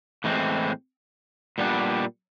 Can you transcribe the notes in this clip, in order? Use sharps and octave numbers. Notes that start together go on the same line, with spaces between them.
A2 E3 G#3 C4
A#2 G3 B3 D4